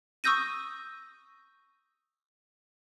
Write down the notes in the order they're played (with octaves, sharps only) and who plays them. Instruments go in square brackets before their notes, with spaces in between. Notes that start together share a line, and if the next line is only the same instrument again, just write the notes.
[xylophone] C#6 D#6 E6 G6 A#6 D#7